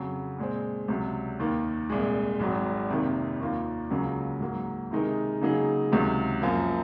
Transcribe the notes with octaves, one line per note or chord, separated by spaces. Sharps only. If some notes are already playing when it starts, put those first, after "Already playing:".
Already playing: F2 C#3 F#3
A#2 G#3 C4
C#2 C3 F#3
D#2 D#3 A#3
C2 A#2 G#3
G#1 G#2 F#3
F2 C3 D#3 A#3
D#2 D#3 A#3 F4
C#2 C#3 F#3 A#3 F4
G#2 F#3 A#3
C3 D#3 G#3 D#4 A#4
C#3 F#3 A#3 D#4 G#4
C#2 C3 D#3 F#3
F#2 F3 A#3 F4